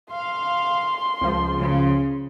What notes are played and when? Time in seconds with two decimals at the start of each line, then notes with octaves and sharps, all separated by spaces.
0.14 F5 C6
1.21 C#2 F3
1.59 C#3